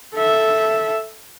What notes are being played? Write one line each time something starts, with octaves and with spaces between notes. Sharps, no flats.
A4 E5